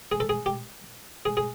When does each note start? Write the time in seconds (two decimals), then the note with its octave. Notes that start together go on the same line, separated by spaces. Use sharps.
0.12 G#4
0.20 A4
0.29 G#4
0.46 G4
1.25 G#4
1.37 G#4